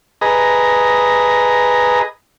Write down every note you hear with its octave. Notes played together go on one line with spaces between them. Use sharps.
G#4 B4 D#5 A#5